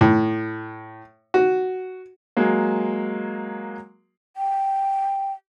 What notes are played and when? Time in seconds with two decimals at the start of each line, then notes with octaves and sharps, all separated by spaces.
0.01 A2
1.34 F#4
2.37 F#3 G#3 A#3
4.37 G5